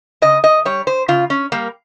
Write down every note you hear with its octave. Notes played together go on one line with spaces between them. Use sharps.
C#3 D#5
D#5
G3 C#5
C5
C#3 F4
C#4
G3 A#3